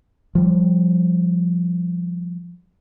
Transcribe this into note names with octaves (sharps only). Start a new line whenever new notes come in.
F3 G3